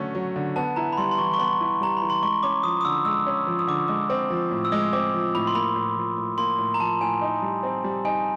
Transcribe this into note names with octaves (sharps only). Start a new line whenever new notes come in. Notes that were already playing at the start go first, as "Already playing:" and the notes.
Already playing: D3 F#3 A3 C#4
F#3
D3
B3 A5
E4 A#5
B5
G3 C6
C6
E3 C#6
C#6
B3 C6
E4
G3 A#5
E3 B5
C6
G#3 C#6
C#4 D6
F3 D#6
D#6
D3 E6
G#3 E6
C#4
F3
D#6
D3 D6
G#3 D6
C4
F3
A2
E6
G#3 D#6
C4 D6
F3
A2 B5
C6
A#3 B5
A2
F3
A2
A#3 C6
A2
A#5
F3 A5
A2 G#5
D#4
G3
C4
G3
D#4 G#5